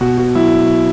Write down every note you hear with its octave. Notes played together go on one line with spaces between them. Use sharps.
B2 F#4
F#4
F#3 E4